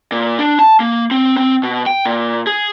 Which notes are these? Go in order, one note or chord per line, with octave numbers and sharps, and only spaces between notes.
A#2
D4
A5
A#3
C4
C4
B2
G5
A#2
G#4